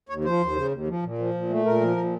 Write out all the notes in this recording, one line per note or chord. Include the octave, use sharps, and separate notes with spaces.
D#2 C#5
F3 C5
D#2
C#3
D#2
F3
A#2
F3
A#2
A3
A#2 A#4
F3
A#2